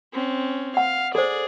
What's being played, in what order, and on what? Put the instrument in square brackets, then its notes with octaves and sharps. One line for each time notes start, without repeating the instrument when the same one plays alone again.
[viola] C4 C#4
[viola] F5 [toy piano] F#5
[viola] G#4 D5 [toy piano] A4 C5